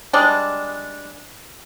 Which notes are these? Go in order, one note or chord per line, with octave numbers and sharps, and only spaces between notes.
G3 G#3 D4